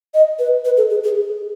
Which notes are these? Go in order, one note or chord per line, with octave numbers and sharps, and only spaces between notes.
D#5
B4
B4
A4
G#4
G#4